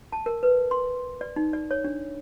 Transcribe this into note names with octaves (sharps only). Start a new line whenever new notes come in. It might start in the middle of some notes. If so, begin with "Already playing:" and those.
A5
A#4
B4
C6
D5
D#4
D5
C#5
D4